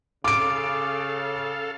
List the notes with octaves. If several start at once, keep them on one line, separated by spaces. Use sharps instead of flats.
C#3 A4 F5 D6 D7